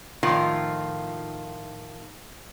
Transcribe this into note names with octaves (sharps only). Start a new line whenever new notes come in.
A2 D#3 F3 F4